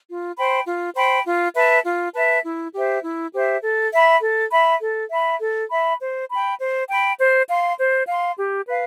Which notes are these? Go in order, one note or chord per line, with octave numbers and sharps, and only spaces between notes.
F4
C5 G5 B5
F4
C5 G5 B5
F4
B4 E5 A5
F4
B4 E5 A5
E4
G4 C5 E5
E4
G4 C5 E5
A4
E5 B5
A4
E5 B5
A4
E5 B5
A4
E5 B5
C5
G5 B5
C5
G5 B5
C5
F5 C6
C5
F5 C6
G4
B4 F5